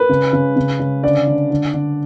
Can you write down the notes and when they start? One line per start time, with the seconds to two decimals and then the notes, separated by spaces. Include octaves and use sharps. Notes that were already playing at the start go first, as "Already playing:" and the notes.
Already playing: B4
0.09 C#3
0.33 C#3
0.56 C#3
0.79 C#3
1.03 D3 D5
1.27 D3
1.51 D3
1.74 D3